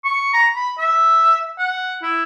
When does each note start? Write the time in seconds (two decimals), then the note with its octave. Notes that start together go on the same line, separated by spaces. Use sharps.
0.04 C#6
0.33 A#5
0.56 B5
0.78 E5
1.58 F#5
2.02 E4